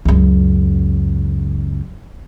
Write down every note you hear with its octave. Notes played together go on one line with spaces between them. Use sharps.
C#2 F#2